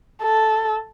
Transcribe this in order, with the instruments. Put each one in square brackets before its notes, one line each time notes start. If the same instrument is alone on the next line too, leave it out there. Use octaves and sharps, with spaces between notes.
[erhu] A4